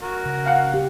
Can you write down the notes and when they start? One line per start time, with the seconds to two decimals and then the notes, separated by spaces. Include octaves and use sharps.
0.02 F#4 A#4
0.26 C#3
0.46 F5 F#5
0.74 G4